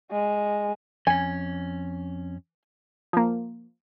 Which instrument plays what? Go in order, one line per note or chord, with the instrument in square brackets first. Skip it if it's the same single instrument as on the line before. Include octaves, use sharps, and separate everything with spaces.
[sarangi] G#3
[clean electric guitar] F2 C#4 [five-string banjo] G#5
[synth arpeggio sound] F3 A#3